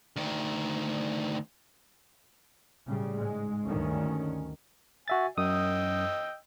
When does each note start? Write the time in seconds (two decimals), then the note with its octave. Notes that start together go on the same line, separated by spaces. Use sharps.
0.16 D2 D#3
2.86 A2 C#3 G3
3.16 G#2 G#3
3.67 D2 G2 D#3 C#4
5.08 F#4 E5 G#5 A6
5.38 F#2 D#5 G5 D#6 E6